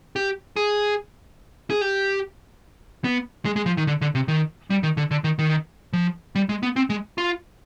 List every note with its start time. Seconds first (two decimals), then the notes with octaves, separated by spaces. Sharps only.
0.16 G4
0.56 G#4
1.70 G#4
1.81 G4
3.04 B3
3.45 G#3
3.56 G#3
3.66 F3
3.77 D#3
3.87 D3
4.01 D3
4.15 C3
4.28 D#3
4.70 G3
4.83 D#3
4.97 D3
5.11 D3
5.24 D#3
5.39 D#3
5.93 F3
6.35 G3
6.49 G#3
6.63 B3
6.76 C4
6.90 G#3
7.18 F4